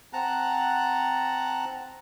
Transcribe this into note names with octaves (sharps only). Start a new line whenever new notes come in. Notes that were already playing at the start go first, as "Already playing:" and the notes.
C4 F#5 A5 A#5 F#6